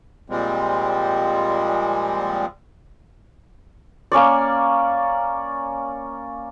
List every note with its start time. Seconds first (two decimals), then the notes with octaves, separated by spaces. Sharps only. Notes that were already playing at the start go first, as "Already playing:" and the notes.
0.30 A#2 F3 G3 G#3 C4
4.12 A#3 C#4 C#5 D5